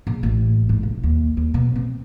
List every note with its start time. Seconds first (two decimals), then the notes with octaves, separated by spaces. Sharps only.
0.07 A#1
0.23 A1
0.69 G#2
0.83 E1
1.04 D#2
1.37 D#2
1.54 B2
1.75 C4